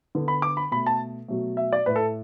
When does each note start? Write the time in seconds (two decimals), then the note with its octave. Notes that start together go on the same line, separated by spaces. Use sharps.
0.15 D3 B3
0.28 B5
0.42 D6
0.57 B5
0.71 B2 A3 B5
0.86 A5
1.28 B2 F#3 A3
1.57 E5
1.73 D5
1.86 A2 A3 B4
1.96 A4